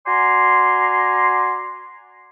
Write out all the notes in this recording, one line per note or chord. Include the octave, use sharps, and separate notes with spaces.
F#4 D5 G#5 A#5 C6